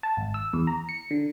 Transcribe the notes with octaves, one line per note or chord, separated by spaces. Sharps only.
A5
G#1
E6
E2
A#5
C#7
D3